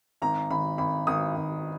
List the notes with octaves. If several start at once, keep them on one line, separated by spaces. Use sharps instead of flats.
G#1 A#5
G#1 B5
G#1 B5
G#1 D#6
G#1